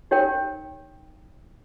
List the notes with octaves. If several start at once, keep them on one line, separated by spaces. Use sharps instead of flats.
D#4 G4 A#4 C#5 G5